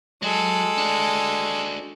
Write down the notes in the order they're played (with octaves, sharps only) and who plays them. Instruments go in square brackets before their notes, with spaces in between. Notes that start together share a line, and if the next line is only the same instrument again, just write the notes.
[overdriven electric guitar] F#3 [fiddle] G#3 A4
[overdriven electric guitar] D4 F#4